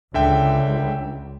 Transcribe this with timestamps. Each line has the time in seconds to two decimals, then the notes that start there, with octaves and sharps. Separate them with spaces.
0.14 C#2 D3 E5 G5